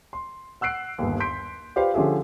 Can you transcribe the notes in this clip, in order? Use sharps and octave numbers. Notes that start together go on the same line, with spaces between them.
C6
F#5 E6 F#6 C7 D7
G1 D#2
C6 G6 B6 D7
F4 G4 B4 C5 D5 F5
D3 F3 C#4 G4 G#4 E5